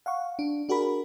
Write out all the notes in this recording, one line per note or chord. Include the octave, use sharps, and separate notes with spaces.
F5 F#5 C#6
D4
D4 F#4 G#4 A#4 B5